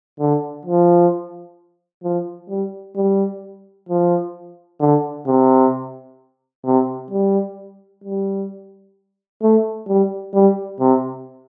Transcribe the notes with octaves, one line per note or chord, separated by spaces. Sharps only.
D3
F3
F3
G3
G3
F3
D3
C3
C3
G3
G3
A3
G3
G3
C3